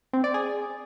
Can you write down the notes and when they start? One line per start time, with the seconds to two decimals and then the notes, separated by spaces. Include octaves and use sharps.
0.13 C4
0.24 D5
0.34 G#4